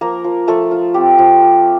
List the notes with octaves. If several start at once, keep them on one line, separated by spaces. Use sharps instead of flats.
F3 A#3 A#4
F3
F3 A3 A4
F4
C4 G4
F3
F4